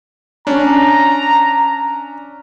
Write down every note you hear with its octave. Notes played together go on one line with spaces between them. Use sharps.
C#4 D4 A#5